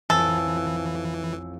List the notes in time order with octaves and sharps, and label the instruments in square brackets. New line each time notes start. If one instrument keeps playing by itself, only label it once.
[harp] A1 F2 C4 [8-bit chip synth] E3 [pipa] A4 [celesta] G#5 E6